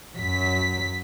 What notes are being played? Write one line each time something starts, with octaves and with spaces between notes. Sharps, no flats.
F#2 F#3 B6